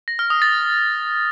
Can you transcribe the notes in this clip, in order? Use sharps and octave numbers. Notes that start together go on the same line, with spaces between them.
A#6
F6
D#6
A6